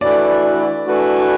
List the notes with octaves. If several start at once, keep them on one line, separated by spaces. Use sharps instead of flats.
E3 A3 D4 F#4 B4 D5
E3 A3 D4 F#4 B4